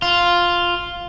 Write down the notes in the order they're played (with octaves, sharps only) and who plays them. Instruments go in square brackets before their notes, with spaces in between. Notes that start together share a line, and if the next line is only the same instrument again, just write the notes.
[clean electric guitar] F4